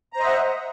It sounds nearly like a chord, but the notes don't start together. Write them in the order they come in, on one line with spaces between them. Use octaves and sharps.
A#5 C5 D#5 E5 F#5